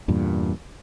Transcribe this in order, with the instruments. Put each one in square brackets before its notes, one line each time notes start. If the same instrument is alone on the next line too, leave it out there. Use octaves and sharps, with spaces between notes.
[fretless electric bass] E2 G2 A#2